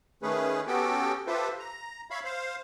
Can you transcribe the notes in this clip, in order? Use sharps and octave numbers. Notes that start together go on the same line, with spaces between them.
D#3 A3 C#4 G#4 B4
B3 C#4 F#4 G4 A4 G5
F4 G4 A4 B4 C5 E5
A#5
C#5 E5 F5 B5
C5 F5